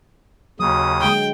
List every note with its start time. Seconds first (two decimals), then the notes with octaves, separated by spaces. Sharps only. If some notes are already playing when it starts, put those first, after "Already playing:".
0.60 D#2 C#3 F#3 D#6
1.01 D3 G#3 G5